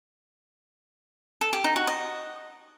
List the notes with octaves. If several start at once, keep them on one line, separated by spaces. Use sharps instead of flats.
A4
G4
D#4
F#4
D#5